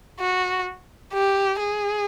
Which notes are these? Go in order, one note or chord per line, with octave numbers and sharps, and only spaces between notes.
F#4
G4
G#4